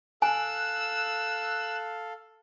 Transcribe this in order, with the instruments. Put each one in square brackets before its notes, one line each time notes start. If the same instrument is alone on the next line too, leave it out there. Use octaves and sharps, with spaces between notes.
[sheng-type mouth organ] A4 F5 [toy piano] G#5 [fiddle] E6 [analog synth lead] F#6